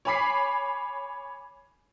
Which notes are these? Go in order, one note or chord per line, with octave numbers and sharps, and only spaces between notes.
C#5 G#5 B5 D6 B6 C7